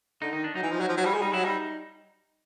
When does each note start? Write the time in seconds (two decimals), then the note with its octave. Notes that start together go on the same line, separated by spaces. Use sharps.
0.22 D3 D#4
0.33 D#3 D#4
0.44 D4
0.55 F#3 D#4
0.63 E3
0.71 F3
0.80 F#3
0.89 F3
0.97 F#3
1.05 G3
1.14 G#3
1.22 G3 D#4
1.33 F#3 E4
1.44 G3 D#4